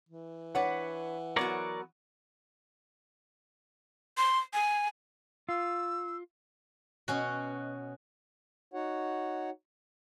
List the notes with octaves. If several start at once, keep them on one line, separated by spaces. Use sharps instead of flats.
E3
D4 B4 C#5 F#5
F#3 B3 F#4 A#4 C#5 D5
C6
G#5
F4 E6
B2 C#4 F#4
D#4 F#4 C#5 F#5